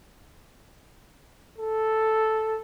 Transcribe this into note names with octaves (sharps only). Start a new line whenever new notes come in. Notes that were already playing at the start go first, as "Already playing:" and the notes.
A4